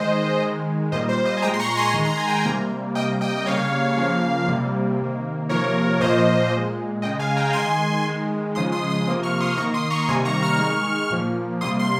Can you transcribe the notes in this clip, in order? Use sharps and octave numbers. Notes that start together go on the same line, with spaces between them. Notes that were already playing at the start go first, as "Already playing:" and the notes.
Already playing: D#3 G#3 C5 D#5
D#3 G#3
A#2 G3 A#3 C5 D#5
C5
C5 D#5
G#5
A#2 G#3 G5 A#5
C6
A#5 C#6
G#5 C6
D#3 G#3 C6
A#5
G#5
G5 A#5
C3 G3 A#3
C3 G3 A#3 D#5 G5
D#5 G5
C#3 G3 A#3 C#5 F5
C#3 F3 A#3
C3 G3 A#3
C3 D#3 A#3
C3 F3 A#3 A#4 C#5
A#2 F3 A#3 C5 D#5
A#2 G#3
C#3 G#3 D#5 G5
F5 G#5
G5 A#5
D#3 G#3 G#5 C6
D#3 G#3
C#3 F3 G#3 C6 D#6
C6 D#6
C6 D#6
C3 F3 A#3 C6 D#6
C#6 F6
C6 D#6
D#3 A#3 A#5 C#6
C6 D#6
A#5 C#6
C3 D#3 G3 A#3 G#5 C6
A#5 C#6
C#6 F6
D#3 G#3
A#2 F3 A#3
C3 G3 A#3 C6 D#6
C6